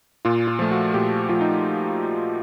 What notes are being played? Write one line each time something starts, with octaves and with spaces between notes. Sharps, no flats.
A#2 F4
F4
F3 A3
F#4
A#2 G4
F3 A3 F4
D#4